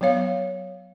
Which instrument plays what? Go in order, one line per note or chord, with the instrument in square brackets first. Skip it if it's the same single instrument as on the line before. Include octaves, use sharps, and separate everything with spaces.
[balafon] F#3 B3 C#5 F5